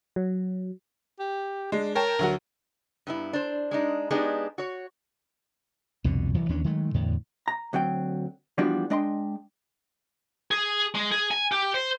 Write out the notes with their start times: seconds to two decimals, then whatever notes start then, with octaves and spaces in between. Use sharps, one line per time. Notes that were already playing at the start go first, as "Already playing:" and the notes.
0.16 F#3
1.19 G4
1.72 G#3 D4
1.95 A#4 C#5 G5 A5
2.19 D2 F#3 F#4
3.07 G2 B3 E4
3.33 D4 C5
3.71 G#3 D4 D#4
4.11 G#3 B3 D4 D#4 G4 G#4
4.58 F#4 C#5
6.04 C2 F2 B2 D3
6.34 C2 E3 F#3
6.49 D#2 E3 C#4 D4
6.64 D#3 F#3 G#3 A3
6.94 E2 A2 D3
7.48 A#5
7.73 D2 F#3 C4 G5
8.58 E3 F3 G3 B3 D4 F#4
8.90 G#3 D4 D#5 G5 A#5 C6
10.51 G#4
10.95 G#3
11.12 G#4
11.31 G#5
11.52 G4
11.74 C5